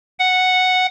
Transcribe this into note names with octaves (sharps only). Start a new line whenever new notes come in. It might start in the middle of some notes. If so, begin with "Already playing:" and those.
F#5